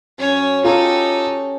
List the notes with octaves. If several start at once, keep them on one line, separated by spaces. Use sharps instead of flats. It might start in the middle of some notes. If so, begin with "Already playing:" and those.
F#2 C#4 C#5
C#4 D#4 F4 G4 A4 A#5